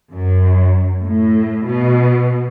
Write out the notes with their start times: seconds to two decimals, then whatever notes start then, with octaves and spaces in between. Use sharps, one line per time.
0.13 F#2
1.04 A2
1.66 B2